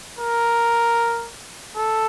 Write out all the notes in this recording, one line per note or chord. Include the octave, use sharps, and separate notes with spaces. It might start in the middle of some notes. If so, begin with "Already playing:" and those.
A#4
A4